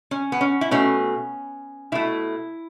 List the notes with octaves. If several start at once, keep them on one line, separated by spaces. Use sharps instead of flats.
C#4
B3
C#4
E4
B2 A3 C#4
B2 A3 E4